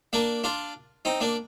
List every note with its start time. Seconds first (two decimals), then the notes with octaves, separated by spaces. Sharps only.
0.13 A#3 D4
0.44 D4 F4
1.05 C4 D#4
1.21 A#3 D4